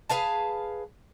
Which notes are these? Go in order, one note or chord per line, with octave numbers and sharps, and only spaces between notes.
G#4 B4 F5 A5